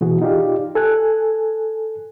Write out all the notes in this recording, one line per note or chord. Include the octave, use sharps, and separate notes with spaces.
B2 E3 F#4 G#4
D#4 F4 G4 D5 F5
A4 G#5 F#6